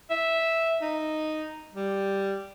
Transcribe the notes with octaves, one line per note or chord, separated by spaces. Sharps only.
E5
D#4
G3